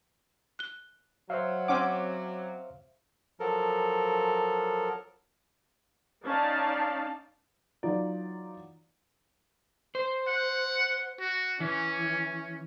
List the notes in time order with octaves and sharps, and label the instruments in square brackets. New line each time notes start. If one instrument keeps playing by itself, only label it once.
[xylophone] F#6 G7
[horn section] F#3 [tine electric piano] C5 E5 F5
[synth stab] C4 C#4 D6 [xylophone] F#5
[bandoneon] F3 F#3 A4 A#4
[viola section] C#4 D#4 D5 F5 A5
[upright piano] E3 F#3 D#4 F4 D5
[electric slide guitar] C5
[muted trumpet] F#5
F#4
[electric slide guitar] E3 [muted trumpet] C#4